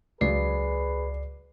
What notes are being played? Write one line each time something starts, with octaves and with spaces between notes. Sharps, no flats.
C#2 C#3 F#3 G#3 G#4 B4 D5 C7